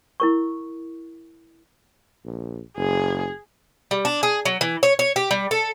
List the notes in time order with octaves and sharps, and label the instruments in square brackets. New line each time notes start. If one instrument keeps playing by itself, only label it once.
[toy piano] E4 A#4 C#6
[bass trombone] A#1
[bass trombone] F#1 [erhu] G#4
[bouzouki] G3
D4
G#4
F#3
E3
C#5
C#5
G4
G3
A4